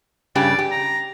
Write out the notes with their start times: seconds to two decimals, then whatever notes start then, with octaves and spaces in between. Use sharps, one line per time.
0.35 G2 C#3 G4 D5
0.59 G4
0.71 A#5